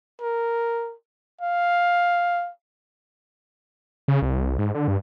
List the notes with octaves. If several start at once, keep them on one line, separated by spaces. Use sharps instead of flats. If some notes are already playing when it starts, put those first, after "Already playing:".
A#4
F5
C#3
C2
G#2
D3
G2